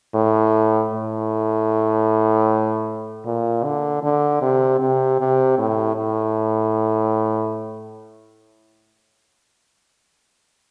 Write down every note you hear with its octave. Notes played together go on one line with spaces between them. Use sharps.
A2
A2
A#2
D3
D3
C3
C3
C3
A2
A2